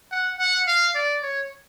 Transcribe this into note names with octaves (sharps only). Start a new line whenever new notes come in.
F#5
F#5
F5
D5
C#5